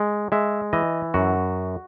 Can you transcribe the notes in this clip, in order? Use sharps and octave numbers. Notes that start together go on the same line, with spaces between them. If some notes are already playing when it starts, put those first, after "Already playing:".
Already playing: G#3
G#3 E5
E3 D#5
F#2 F#4